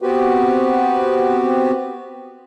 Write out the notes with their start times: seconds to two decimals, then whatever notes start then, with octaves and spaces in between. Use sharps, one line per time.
0.02 B3 C4 F#4 G4 B4